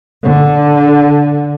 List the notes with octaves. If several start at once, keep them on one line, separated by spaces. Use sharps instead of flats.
D3